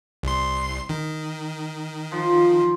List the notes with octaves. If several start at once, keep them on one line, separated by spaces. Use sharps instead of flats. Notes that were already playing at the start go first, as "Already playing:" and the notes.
C2 C6
D#3
F3